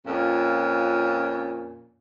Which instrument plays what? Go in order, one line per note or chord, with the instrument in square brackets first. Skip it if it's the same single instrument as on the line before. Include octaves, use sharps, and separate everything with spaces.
[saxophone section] F2 A#2 C#4